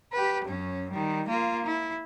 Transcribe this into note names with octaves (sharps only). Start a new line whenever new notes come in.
G4 B4
F#2 C#4
D#3 G3
A#3 F4
E4